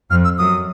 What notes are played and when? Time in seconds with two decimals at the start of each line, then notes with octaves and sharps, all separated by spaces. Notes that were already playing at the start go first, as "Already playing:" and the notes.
0.10 F2 F6
0.24 E6
0.38 F#2 D#6